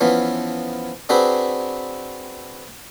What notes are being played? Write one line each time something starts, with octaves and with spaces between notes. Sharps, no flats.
E3 F3 B3 C#4
C4 D4 F#4 G#4 B4 C5